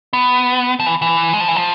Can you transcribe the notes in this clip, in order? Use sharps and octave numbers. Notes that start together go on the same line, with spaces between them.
B3
F3
E3
E3
G#3
F3
E3
F3